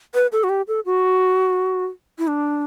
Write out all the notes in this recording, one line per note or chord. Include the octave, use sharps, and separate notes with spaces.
B4
A4
F#4
G4
A4
F#4
E4
D4